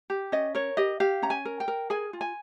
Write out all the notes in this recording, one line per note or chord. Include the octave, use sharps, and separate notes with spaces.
G4
C#4 D#5
A#4 C#5
G4 D#5
G4 F5
C#4 A#5
G#5
A#4
G5
A#4
G#4 G#5
F4
G#5